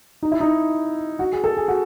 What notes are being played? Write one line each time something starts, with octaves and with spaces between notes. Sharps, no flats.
D#4
E4
D#4
F#4
G#4
A4
G#4
F#4